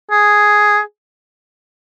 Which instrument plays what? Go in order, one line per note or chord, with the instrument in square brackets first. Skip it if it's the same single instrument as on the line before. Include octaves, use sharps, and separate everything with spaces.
[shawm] G#4